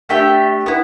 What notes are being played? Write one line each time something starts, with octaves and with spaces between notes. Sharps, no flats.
A3 D4 G4 E5 G5
B3 E4